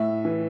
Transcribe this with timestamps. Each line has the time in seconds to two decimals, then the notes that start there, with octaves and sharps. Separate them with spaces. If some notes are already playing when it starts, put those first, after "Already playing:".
Already playing: A2 E5
0.25 E3